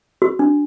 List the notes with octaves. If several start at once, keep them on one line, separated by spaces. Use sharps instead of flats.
F#4
D4